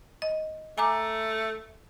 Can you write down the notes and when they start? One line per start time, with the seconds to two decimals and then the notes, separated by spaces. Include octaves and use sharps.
0.22 D#5
0.78 A3 G#5 A#5 D6